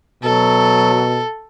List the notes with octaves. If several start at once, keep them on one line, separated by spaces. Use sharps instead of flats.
B2 F#3 A4